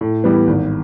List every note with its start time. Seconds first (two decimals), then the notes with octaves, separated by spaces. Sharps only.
0.01 A2
0.24 E3 G3 B3
0.47 G#1